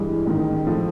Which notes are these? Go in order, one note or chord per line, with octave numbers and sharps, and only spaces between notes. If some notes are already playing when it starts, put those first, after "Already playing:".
Already playing: G2 E3 G#3
A1 G#2 D#3
A2 F3 A3